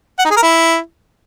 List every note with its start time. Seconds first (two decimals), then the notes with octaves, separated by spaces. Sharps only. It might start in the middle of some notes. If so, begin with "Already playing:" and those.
0.19 F#5
0.25 D#4
0.31 G#4
0.36 A#4
0.42 E4